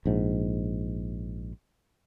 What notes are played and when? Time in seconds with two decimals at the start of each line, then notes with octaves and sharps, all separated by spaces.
0.06 A#1 G#2